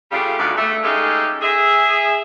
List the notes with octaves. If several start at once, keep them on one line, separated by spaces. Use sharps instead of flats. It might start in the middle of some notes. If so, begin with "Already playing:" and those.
C#3 G3 A3 D4 F4 G4
D2 D#3 G#3 B3 D5 F5
A3
G#3 C#4 D#4 G4 A4 F5
G#4 E5